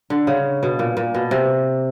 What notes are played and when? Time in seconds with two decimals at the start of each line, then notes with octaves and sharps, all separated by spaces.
0.10 D3
0.27 C#3
0.63 B2
0.79 A#2
0.97 A#2
1.14 B2
1.31 C3